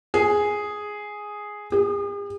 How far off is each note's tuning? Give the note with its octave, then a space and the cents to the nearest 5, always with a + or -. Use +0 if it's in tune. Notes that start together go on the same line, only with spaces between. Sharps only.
G#4 +0
G#4 -45